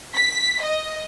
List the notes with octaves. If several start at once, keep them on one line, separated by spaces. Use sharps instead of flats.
B6
D#5